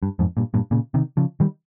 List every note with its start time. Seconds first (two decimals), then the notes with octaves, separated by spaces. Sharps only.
0.03 G2
0.19 F2 G#2
0.37 G2 A#2
0.54 G2 A#2
0.71 A#2 C#3
0.94 C3 D#3
1.17 C#3 F3
1.40 D#3 G3